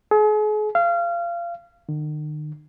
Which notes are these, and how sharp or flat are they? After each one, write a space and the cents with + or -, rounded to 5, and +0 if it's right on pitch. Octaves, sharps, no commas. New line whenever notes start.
G#4 +40
F5 -25
D#3 -45